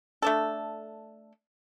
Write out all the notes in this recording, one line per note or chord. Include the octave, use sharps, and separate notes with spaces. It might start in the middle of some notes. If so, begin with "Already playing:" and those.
A3 D4 A4